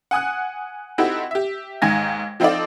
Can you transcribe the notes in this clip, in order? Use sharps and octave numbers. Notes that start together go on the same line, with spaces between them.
F#5 G#5 D#6 F#6
C4 D#4 E4 F#4 G4 A4
G4 E5
D#2 G#2 D#3 G#5 G#6 A#6
F3 C4 D#4 F4 A4 D5